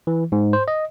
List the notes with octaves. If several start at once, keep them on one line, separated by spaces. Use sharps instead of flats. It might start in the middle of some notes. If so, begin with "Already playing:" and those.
E3
G#2
C5
D#5